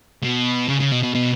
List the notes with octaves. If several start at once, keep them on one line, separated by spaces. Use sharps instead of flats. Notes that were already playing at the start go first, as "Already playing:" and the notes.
B2
C#3
C#3
B2
B2
B2